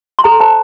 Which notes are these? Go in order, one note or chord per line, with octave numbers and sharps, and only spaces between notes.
C6
A4 A#5
C5 A5